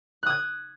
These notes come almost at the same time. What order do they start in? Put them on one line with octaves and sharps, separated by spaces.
F#6 D#6 G#6